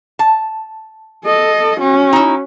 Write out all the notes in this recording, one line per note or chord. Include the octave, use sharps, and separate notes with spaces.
A5
A4 D#5
C#4 F#4
D#4 E4